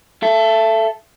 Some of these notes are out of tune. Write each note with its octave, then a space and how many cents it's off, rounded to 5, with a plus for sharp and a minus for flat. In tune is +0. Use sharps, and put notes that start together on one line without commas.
A4 +0 E5 +30